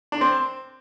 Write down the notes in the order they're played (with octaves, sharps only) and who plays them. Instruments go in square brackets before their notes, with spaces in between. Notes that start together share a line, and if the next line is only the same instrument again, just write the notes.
[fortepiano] D4
[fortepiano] C4 [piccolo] C6